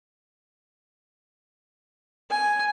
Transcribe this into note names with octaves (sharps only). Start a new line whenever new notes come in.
G#5